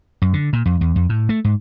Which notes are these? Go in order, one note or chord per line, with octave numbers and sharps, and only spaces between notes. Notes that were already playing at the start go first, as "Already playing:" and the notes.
F#2
D3
A#2
F2
E2
F2
A2
A3
G#2